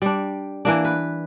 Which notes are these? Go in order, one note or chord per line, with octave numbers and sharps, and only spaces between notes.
G3 D4
E3 A#3 D4
B4